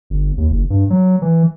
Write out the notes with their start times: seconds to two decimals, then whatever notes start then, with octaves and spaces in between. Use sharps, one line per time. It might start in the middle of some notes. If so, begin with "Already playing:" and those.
0.10 G1
0.38 D#2
0.50 F#1
0.70 G2
0.90 F#3
1.22 E3